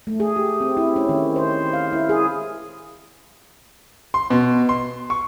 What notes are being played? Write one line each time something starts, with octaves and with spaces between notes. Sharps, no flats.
A3
G#4
G4
C4
E4
C#4
D#3
C5
F5
E4
G#4
C6
B2
C6
C#6